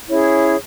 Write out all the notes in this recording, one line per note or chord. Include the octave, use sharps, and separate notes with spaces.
C#4 E4 G#4 C#5